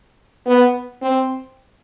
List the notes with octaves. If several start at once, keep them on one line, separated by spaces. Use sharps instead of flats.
B3
C4